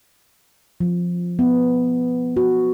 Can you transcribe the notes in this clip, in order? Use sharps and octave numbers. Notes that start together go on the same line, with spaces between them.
F3
B3
F#4